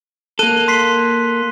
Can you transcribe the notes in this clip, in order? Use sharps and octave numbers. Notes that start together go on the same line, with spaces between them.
A#3 A4 F#6 D#7
C6 B6 C7